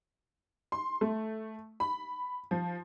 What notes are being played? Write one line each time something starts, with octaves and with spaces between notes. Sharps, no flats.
C6
A3
B5
F3